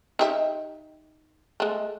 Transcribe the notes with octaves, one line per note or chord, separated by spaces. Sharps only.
D#4 G4 E5
G#3 A3